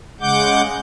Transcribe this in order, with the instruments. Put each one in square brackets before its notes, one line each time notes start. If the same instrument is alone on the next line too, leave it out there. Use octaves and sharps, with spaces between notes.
[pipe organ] C#3 G#3 F#5 D6 G6